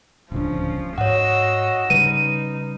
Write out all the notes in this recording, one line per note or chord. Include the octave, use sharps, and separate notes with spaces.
D1 C#2 F3 C#4 D4
G#2 F#4 C#5 D#5 F#5 E6
C#3 G3 D#4 B4 D#7